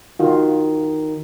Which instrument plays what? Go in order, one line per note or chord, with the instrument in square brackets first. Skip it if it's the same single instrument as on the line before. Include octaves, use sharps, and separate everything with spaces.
[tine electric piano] D#3 [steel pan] F4 F#4